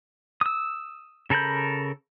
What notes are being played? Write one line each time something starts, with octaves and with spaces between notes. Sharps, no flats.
D#6 E6
C#3 A4 A#4 B5 G6